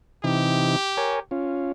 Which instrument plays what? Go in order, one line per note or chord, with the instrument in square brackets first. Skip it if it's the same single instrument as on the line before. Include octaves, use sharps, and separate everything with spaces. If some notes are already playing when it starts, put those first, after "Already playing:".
[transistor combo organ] C3 E3 D#4 [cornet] G4
[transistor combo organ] A#4 C#5 G#5
C#4 F4